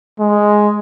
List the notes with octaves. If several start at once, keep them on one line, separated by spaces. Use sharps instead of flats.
G#3